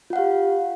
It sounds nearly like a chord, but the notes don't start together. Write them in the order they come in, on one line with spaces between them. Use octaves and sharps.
F4 F#5 F5 G4